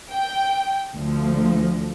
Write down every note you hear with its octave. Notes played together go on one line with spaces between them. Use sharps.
G5
D2 F3